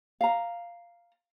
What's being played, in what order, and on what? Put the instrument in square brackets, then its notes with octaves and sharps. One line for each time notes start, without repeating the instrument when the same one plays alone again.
[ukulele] F5 A#5